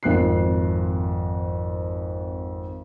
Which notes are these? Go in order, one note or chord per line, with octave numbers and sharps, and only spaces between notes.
G#1 F2 F#6 C7